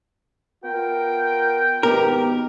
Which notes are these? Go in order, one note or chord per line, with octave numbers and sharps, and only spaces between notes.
B3 F4 A#4 G5
G#1 B3 D#4 G4 A#4